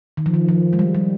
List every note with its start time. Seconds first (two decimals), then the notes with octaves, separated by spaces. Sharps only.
0.17 D#3
0.26 F3
0.34 D#3
0.49 F3
0.73 G#3
0.79 G3
0.95 G3